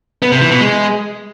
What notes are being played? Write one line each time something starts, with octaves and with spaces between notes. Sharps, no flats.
B3
C3
E3
B2
G#3